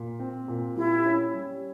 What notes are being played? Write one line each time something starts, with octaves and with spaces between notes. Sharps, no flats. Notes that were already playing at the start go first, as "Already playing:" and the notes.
Already playing: A#2
C4
A#2
G3 E4
C#4
G3